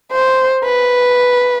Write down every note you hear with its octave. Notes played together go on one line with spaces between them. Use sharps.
C5
B4